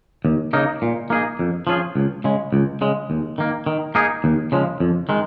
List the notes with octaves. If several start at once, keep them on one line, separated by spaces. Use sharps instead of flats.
D#2
C#3 A#3 D#4
A#2
A#3 D#4 G#4
F2
F3 C#4 F4 G#4
C#2
C#3 G#3
C#2
C#3 G#3
D#2
D#3 A#3
D#3
A#3 D#4 G#4
D#2
C#3 F3 G#3
F2
D#3 G#3